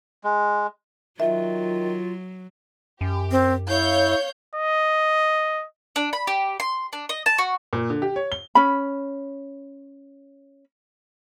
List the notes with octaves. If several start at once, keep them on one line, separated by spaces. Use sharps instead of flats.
G#3
D#3 F#3 F4 E5
F#2 G4
C4
E4 C#5 F5 G6
D#5
D4
B5
G4
C6
D4
D#5
A5
F#4
A#2
D3
G4
C#5
G7
C#4 B5